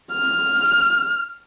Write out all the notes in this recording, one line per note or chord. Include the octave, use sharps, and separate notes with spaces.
F6